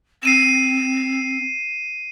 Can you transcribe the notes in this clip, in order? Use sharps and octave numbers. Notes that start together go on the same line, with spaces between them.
C4 C7 D#7 E7